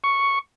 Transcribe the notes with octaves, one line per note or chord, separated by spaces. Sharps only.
C#6